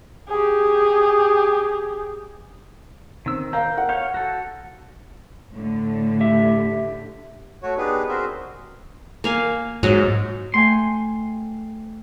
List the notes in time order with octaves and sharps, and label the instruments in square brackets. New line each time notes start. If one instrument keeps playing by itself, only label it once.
[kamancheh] G4 G#4
[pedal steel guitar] D#3 E6 [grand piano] C4
[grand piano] A#4 F5 A#5 [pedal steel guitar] G5
[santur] F#5
[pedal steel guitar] C#5 F5 [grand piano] G6
[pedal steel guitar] F#4 A4
[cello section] A2 D3
[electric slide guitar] G4 E5
[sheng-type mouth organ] A3 F#4 C#5
B3 D4 D#4 G4 G#4 B4
C4 F#4 G#4 A#4 C5 E5
[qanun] A#3 F5 G#5
[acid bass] G#2 [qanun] F#3 F#4 D#5
[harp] A3 G5 G#5 [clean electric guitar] C6